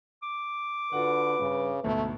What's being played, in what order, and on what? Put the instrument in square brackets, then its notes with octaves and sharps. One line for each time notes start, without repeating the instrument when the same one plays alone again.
[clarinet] D6
[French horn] D3 [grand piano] F4 F#4 F#5 [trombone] B4
[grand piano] G2 [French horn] C#3
[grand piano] D2 G#2 B2 [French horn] A3